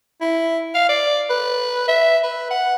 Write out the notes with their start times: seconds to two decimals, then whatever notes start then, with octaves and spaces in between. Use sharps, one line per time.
0.21 E4
0.75 F5
0.89 D5
1.30 B4
1.88 E5
2.23 B4
2.51 F#5